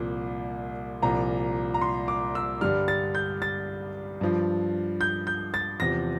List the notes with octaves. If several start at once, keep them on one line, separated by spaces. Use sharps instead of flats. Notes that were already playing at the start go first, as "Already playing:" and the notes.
Already playing: C2 A#2 F3
C2 A#2 F3 A#5
A#5
C6
D6
E6
G2 D3 G3 F6
A6
G6
A6
G2 F3
G6
G6
A6
E2 C3 F3 A#6